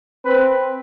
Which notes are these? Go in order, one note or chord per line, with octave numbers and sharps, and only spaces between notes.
C4 B4